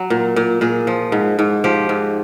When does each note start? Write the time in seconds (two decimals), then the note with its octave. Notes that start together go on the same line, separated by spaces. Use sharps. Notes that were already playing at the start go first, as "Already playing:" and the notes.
Already playing: F#3
0.10 A#2
0.36 A#2
0.61 A#2 G#4
0.87 F3
1.12 G#2
1.39 G#2
1.64 F3 G4
1.89 G#2